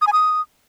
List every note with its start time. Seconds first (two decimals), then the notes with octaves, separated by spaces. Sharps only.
0.02 D#6
0.07 G#5
0.13 D#6